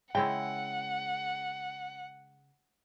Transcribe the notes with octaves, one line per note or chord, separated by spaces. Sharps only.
C#3 G#3 E4 F#5 G5